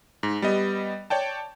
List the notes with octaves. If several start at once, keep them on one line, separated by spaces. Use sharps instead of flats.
G#2
G3 B3 D#5
C#5 D5 G5 A5